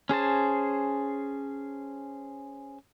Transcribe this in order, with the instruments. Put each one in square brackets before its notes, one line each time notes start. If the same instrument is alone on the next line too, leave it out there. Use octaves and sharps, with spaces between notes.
[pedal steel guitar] C#4 G#4 C5 A5